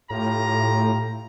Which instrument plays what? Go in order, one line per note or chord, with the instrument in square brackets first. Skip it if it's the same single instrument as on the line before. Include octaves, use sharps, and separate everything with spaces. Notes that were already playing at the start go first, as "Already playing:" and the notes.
[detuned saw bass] A2 [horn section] F4 G4 A#5